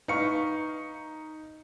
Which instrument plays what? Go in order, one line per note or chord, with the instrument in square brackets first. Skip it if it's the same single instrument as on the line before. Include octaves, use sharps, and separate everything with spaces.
[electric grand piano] D#4 C#7 [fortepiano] B4 F5 C#6